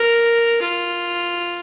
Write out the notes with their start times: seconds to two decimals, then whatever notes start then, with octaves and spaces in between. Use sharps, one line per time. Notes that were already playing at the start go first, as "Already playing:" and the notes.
Already playing: A#4
0.61 F4